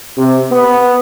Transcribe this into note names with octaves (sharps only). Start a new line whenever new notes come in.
C3
B3